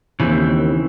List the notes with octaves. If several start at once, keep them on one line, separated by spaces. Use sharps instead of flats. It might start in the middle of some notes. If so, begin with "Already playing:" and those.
D#2 C#3 E3 C4